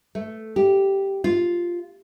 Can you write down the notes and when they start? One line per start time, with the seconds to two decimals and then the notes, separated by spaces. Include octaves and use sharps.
0.15 A3
0.56 G4
1.24 F4